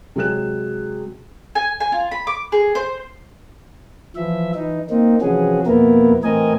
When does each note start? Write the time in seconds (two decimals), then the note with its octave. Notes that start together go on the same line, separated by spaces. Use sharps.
0.16 C3 F#3 G#3 G#4 F#6 E7
1.55 G#5
1.80 G#5
1.92 F4
2.11 B5
2.27 D6
2.52 G#4
2.75 C5
4.16 E3 F3 E5
4.55 E3 D#4
4.90 A#3 C4 D#4
5.21 C3 E3 F3 C#4 F#4 G#4
5.66 F2 B2 A#3 B3 E4 A#4
6.24 A2 E3 C4 A#4 D#5 G#5